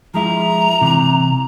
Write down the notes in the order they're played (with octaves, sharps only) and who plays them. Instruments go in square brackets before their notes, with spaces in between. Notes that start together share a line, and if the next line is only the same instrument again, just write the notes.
[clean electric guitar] F3 G#3 E4 [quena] A#5
[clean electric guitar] C3 E3